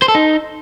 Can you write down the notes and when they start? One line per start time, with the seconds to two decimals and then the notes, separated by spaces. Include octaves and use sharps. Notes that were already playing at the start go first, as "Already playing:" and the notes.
0.02 C5
0.08 A4
0.15 D#4